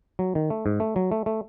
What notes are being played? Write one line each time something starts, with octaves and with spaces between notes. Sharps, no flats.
F#3
D#3
A3
G#2
A3
F#3
A3
A3